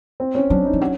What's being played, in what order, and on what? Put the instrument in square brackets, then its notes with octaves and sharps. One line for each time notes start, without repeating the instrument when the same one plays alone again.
[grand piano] C4
C#4
[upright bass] F#3 [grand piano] D4
[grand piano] D#4
[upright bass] F3
[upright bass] F#3 [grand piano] C#4